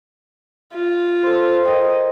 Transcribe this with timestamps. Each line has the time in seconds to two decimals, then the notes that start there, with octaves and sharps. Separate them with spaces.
0.74 F4
1.23 A4 C5
1.65 A#4 D#5 G5